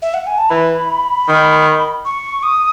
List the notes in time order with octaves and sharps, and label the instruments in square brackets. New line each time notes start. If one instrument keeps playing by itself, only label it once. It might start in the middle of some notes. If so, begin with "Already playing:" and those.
[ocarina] E5
F#5
G#5
A5
[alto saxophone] E3 [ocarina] B5
[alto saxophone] D#3
[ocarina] C#6
D#6